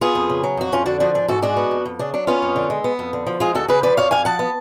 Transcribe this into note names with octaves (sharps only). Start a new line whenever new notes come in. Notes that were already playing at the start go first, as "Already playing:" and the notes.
B3 F4 G#4
F2
C#3
F#3
F2 F#4
F2 C#4 F4
D3 D4 F#4
F3 D4 F#4
G#2 D4
G#2 F#4 A4
G#3 D4 F#4
B3
F2
F2
C#3 D4
F#3 D4
B3 C#4 F4
F2
D3
G#3
B3
F2
D3
F3
G#3 F4 G#4
D2 F#4 A4
C#3 G#4 B4
F3 B4 D5
F2 C#5 F5
F2 F5 G#5
F3 F#5 A5
B3